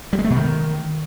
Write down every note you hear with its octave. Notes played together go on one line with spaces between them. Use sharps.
G3
G#3
A3
B2
D#3